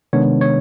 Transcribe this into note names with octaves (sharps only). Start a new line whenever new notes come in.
C3 D#3 G#3 B3 D4 C#5
C#5